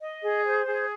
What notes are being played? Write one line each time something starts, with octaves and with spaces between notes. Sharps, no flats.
D#5
G#4
C5
G#4